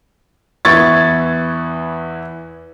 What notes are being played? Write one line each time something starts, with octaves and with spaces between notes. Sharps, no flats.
E2 E3 E4 C#6 G#6 A6